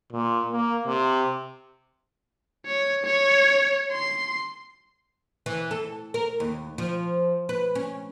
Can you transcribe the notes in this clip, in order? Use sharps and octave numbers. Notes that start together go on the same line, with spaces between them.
A#2
A#3
C3
C#5
C#5
C6
E3
A4
A#4
D#2
F3
B4
C#4